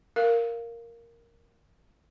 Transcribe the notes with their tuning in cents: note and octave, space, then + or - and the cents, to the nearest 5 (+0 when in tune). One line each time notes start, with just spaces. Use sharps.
A#4 +0 F5 -5